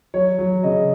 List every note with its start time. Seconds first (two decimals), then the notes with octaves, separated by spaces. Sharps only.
0.14 F#3 C#5
0.39 F#3
0.63 C#3 D#5